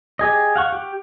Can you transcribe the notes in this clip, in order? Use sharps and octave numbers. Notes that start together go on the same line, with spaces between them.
G4 G#4 D#5
F5 F#5 C#6
G4